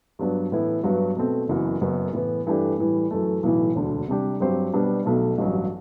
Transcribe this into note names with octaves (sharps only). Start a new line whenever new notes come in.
G2 F#3 B3 D4
A2 E3 B3 E4
G2 F#3 B3 F#4 B4
B2 A3 C4
F#1 F#2 E3 B3 F#4
F#1 F#2 F#3 B3 F#4
A2 E3 B3
G2 E3 A3 D4 G4
A2 E3 G3
F#2 E3 A3
B1 A2 E3
E1 D2 D3
C3 G3 D4 G4
G2 F#3 C4 G4 C5
B2 G3 B3 D4 F#4
B1 B2 A3
A1 G2 F#3